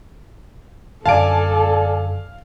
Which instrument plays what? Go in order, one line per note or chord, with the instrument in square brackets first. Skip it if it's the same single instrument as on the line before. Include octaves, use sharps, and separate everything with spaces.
[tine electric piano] F#2 D3 [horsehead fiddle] A4 [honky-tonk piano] D5 G#5 A5 [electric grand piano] F5 D7